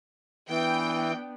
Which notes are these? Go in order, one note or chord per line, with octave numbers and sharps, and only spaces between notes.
E3 B3 D4 G5